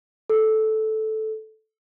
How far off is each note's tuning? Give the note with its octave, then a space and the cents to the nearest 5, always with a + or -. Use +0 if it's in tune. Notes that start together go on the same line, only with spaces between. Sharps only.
A4 -10